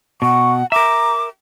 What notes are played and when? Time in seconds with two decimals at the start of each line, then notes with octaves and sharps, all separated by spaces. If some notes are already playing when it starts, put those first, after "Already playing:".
0.22 B2 F#5 C#6
0.72 A#4 E5 A#5 D6